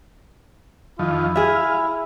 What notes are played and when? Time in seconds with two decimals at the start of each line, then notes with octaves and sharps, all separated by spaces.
0.99 F2 D#3 F3 E4
1.36 G#4 E5 F5